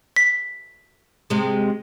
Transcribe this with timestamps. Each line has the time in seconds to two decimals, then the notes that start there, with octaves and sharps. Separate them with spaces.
0.16 B6
1.30 C3 G#3